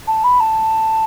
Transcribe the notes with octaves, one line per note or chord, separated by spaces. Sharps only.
A5
B5
A5